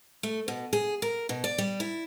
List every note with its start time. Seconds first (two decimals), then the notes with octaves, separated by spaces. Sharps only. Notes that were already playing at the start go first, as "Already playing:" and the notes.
0.23 A3
0.48 B2
0.73 G#4
1.02 A#4
1.29 B2
1.44 D5
1.58 G3
1.80 E4